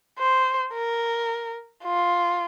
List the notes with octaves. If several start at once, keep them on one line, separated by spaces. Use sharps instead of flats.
C5
A#4
F4